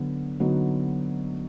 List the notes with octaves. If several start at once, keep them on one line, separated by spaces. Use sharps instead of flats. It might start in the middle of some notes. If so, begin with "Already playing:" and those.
Already playing: D3 F#3 B3
D3 F#3 B3 D#4